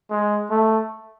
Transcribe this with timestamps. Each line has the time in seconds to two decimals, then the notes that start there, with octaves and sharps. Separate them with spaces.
0.10 G#3
0.50 A3